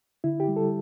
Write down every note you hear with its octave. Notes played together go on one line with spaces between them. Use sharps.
D3 E4
G4
G3
A4